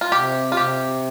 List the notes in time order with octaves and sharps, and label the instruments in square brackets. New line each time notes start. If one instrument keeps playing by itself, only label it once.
[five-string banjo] F4
[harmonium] C3 [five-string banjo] G4
[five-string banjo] F4
[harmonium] C3 [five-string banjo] G4